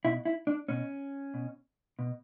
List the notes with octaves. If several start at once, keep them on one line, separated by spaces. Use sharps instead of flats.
B2 E4
E4
D4
B2 C#4
B2
B2